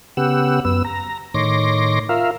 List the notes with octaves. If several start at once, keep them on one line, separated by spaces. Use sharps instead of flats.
C#3 B3 G4 F#5 E6
F#2 B3 E6
A#5
A2 D#3 C#5 C6 D6 A#6
F4 A#4 E5 F5